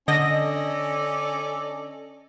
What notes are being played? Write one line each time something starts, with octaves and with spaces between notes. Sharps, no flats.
D3 C#4 A4 D5 D#5 A#6